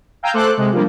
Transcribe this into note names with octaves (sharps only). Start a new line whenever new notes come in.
F5 G5 G#5 A#5 E6 G6
A3 A4 C5 D6 F#6
C3 G#3
F3 G3 A#3 D4